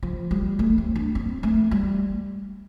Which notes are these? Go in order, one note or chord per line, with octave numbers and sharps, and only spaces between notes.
F3
G3
A3
C4
D4
C4
A3
G3